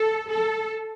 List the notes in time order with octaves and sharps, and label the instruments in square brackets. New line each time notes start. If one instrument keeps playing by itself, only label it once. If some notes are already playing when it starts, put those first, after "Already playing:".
Already playing: [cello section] A4
A4